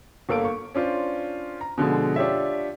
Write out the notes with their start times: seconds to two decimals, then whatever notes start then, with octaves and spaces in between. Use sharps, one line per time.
0.29 G1 A#3 A4 F5 D7
0.45 C#6
0.74 C#4 D4 F4 C5
1.61 A#5
1.78 B2 D3 F3 G#3
2.16 D4 F4 G4 C#5 E5